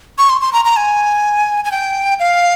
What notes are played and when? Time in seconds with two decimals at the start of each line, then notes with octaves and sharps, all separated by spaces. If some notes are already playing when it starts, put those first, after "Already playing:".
0.18 C#6
0.30 C6
0.41 C6
0.53 A#5
0.65 A#5
0.77 G#5
1.64 G#5
1.72 G5
2.20 F5